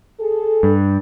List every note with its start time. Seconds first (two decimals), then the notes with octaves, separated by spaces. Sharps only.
0.21 G#4 A4
0.63 G2